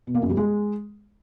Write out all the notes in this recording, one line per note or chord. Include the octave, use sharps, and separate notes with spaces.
B2
A#3
F#2
G3
G#3